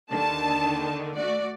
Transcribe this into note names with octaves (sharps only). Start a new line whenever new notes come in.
D#2 D3 D#3 A5
A3 F#4 D5